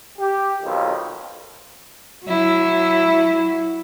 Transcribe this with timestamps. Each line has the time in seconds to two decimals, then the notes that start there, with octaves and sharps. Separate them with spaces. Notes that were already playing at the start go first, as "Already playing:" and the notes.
0.19 G4
0.63 B1 F2 D#3 F3 C4
2.24 F#3 E4